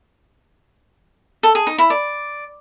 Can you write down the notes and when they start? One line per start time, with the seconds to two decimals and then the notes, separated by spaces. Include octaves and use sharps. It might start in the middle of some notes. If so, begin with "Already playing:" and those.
1.43 A4
1.55 G#4
1.67 D#4
1.78 E4
1.90 D5